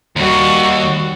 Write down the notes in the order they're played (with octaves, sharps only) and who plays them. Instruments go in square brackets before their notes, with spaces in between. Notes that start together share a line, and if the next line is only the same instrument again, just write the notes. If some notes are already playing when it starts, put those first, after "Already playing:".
[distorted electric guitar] D#2 [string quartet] G3 F#4